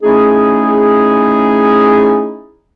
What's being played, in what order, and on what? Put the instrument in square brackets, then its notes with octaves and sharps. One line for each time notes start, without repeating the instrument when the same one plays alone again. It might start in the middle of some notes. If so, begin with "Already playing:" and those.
[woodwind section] A3 C#4 D#4 E4 G#4